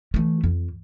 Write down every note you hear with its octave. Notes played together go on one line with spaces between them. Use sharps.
E3 A3
F2